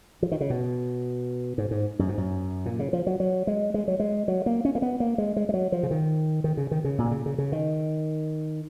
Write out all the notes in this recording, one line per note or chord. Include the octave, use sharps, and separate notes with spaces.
F3
D#3
C#3
B2
G#2
G#2
F#2
G#2
F#2
A#2
C#3
F3
F#3
F#3
G#3
G#3
F#3
G#3
F#3
A#3
C#4
A#3
B3
A#3
G#3
G#3
G#3
F#3
F3
C#3
D#3
D#3
C#3
D#3
C#3
A#2
B2
C#3
C#3
C#3
D#3